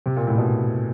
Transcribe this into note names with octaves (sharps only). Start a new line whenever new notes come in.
C3
A#2
A2
B2